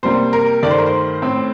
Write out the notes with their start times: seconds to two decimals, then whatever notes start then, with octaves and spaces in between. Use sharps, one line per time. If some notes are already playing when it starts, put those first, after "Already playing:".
0.03 C3 G3 A#3 C5
0.33 A#4
0.63 G2 D#3 A3 D5
0.71 C5
0.78 A#4
0.86 C5
1.22 A2 A3 C4